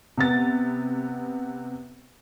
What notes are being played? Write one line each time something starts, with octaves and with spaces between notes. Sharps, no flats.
C3 B3 A6